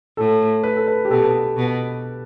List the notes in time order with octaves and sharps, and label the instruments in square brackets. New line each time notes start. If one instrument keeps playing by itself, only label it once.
[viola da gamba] A2 [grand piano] A4
[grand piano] B4
A4
B4
G4
[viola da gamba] B2 [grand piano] A4
[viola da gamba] B2